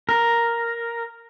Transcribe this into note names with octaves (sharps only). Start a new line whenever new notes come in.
A#4